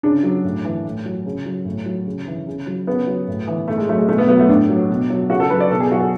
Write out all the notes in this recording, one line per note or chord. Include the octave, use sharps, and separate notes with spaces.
C#3 D4
F#3
A2
E3
A2
F#3
C#3
F#3
A2
F#3
C#3
E3
C#3
F#3
C#3 B3
F#3
A2
E3
A2 A3
G#3
F#3 A3
G#3
B2 A3
B3
F#3 B3
A3
A2 D4
F#3
B2
F#3
C#3 F#4
A4
F#3 B4
D5
B2 A4
G#4
F#3 F#4
A4